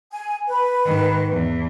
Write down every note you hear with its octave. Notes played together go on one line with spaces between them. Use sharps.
G#5
B4
G#2 D#3
E2